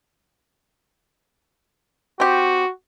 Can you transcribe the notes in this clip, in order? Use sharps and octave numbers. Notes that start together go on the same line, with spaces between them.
C4 F#4 G4